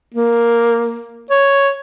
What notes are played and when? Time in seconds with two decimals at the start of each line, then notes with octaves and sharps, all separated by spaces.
0.14 A#3
1.30 C#5